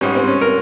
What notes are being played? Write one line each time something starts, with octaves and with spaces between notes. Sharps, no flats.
G#2 G3 C#4
C4
C#4
A#4